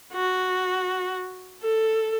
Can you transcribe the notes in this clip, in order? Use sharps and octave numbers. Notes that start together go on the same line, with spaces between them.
F#4
A4